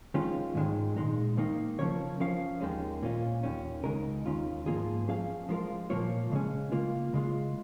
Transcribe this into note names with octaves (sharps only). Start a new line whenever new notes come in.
D#3 G#3 C#4 F4
G#2 D#3 G#3
A#2 G#3 D#4
D#3 A#3 D#4
C#3 F3 C#4 A#4 C#5
F3 C#4 A#4 F5
D#2 D#3 G#3 C#4
A#2 A#3 C#4 F4
D#2 D#3 C#4
C#2 C#3 G#3 D#4 A#4
D#2 D#3 C#4 F4
G#2 F3 A#3 F4 G#4
F3 C#4 G#4 F5
F3 G#3 F4 A#4 F5
A#2 F3 A#3 F4 C#5
C#3 G#3 C#4
C#3 A#3 F4
C#3 G#3 F4